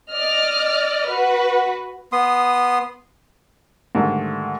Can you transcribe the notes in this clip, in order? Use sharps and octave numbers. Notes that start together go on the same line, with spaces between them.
D5 D#5 F6
F#4 B4
B3 C6 D#6
G#2 D3 D#3 G3 A3